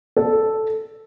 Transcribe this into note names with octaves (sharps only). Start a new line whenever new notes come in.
A4